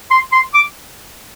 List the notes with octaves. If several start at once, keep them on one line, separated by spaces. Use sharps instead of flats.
C6
C6
D6